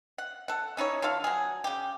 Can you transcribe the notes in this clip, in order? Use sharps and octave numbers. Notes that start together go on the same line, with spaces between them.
F#5
A4 F#5
C#4 D#4 E4 C#5
D3 F4 A4 F5
F#3 G#4
C#3 G4